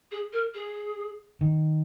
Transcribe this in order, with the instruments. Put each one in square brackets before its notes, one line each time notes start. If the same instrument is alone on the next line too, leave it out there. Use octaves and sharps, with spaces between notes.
[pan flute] G#4
A#4
G#4
[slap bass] D#3